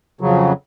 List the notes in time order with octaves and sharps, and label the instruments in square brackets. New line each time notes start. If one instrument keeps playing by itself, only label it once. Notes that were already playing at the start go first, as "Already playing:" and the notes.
[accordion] F2 C#3 F#3